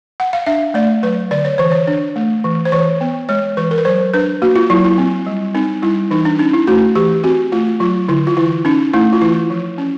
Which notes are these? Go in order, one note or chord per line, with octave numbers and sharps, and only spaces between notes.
F#5
F5
D4 E5
A3 D5
F#3 B4
D3 D5
C#5
E3 C5
C#5
D4
A3
E3
C5
E3 C#5
B3
G#3 C#5
E3 B4
A#4
B4
F#3 C5
D4 B4
A#3 F#4
F4
F#3 E4
E4
C4
G3
C4 D#4
G3 E4
E3 D#4
D4
C#4 D#4
E4
A3 F#4
E3 G4
C4 F#4
A3 F4
F#3 F4
D3 E4
F4
E3 E4
C#4 D#4
A3 E4
F4
E3 E4
F3
C#4